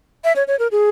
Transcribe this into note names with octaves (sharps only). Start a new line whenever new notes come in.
E5
C#5
C#5
A#4
G#4